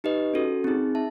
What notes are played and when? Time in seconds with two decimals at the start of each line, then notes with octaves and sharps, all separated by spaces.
0.04 D#4 G4 B4 D#5
0.34 C#4 F#4 A4
0.64 C4 D#4 G#4
0.95 E5 A5